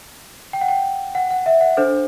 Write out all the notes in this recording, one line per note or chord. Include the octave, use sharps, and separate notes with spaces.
G5
F#5
G5
F#5
F#5
E5
F#5
D4 A4 C5